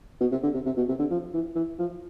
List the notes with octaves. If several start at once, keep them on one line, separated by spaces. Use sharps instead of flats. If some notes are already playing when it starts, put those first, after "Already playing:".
B2
C3
D3
C3
C3
B2
C3
D3
F3
E3
E3
F3